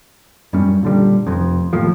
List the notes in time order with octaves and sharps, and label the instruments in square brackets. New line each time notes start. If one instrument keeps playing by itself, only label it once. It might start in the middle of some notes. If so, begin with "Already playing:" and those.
[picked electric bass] F#2 G3 C#4
A#2 D3 G3
F1 F2
D#2 A2 F3